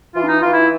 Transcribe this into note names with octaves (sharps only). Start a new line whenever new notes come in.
E3 F4
D4
D#4
E3 F4
E4